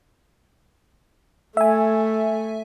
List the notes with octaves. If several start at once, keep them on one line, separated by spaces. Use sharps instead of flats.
A3 E5 G#5